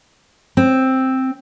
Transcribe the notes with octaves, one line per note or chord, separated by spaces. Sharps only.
C4